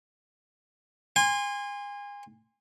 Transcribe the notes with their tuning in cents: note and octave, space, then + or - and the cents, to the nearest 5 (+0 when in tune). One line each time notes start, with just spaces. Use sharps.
G#5 -30 C6 +0